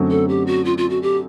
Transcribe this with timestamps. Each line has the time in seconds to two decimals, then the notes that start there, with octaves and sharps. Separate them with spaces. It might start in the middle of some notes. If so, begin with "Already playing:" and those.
Already playing: F#2 D3 F#3 A3 C4
0.11 A4
0.29 G4
0.47 F#4
0.65 F4
0.78 F4
0.90 F#4
1.03 G4